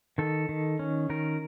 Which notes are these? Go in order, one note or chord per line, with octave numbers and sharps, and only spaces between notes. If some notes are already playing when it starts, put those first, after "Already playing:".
D#3 A4
D#3
C#4
D#3 A#4